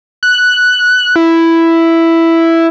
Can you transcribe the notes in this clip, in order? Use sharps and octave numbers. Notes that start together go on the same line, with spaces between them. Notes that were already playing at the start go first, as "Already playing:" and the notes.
F#6
E4